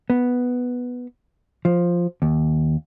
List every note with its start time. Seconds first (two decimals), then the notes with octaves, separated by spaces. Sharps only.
0.10 B3
1.65 F3
2.22 D#2